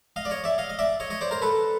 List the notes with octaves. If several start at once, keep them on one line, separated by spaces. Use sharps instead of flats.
D#5 F5
D5
C#5 D#5
D5 E5
D#5 F5
D#5
D5 E5
C#5 D#5
C#5 D#5
C5 D5
A#4 C5
A4 B4